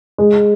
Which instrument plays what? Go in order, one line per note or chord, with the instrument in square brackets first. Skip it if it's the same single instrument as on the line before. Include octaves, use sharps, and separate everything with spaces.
[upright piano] G#3